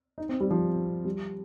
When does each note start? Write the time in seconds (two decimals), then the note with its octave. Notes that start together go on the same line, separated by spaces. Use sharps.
0.18 D#4
0.29 C4
0.40 G3
0.50 F3
1.05 G3